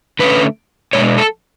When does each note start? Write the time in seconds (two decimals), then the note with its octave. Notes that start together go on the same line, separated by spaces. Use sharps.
0.19 D3 A3 C#4 B4
0.93 B2 G#3 D4 C#5
1.18 A4